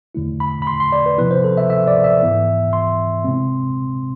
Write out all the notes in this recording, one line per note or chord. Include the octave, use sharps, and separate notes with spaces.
E2 D3 A3 E4
B5
B5
C6
C6
D5
B4
C3 F3 B3 E4 B4
C5
A4
E5
E5
D5
E5
G#2 E3 B3 E4
C6
C3 G#3 C4